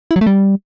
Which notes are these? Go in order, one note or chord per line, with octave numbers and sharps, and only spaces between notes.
E4
F#3
A3
G3